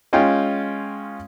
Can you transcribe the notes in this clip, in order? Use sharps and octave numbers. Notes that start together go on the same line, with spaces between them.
G#3 C#4 F4 F5 G5